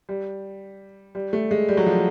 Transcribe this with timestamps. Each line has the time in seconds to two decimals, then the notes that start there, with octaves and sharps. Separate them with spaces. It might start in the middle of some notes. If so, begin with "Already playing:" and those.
0.09 G3
1.15 G3
1.33 A3
1.51 G#3
1.69 G3
1.77 F#3
1.87 F3